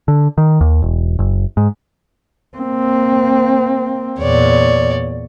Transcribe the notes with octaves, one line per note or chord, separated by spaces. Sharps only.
D3
D#3
D#2
E1
F#1
G#2
A#3 C4
E2 A#2 C#5 D5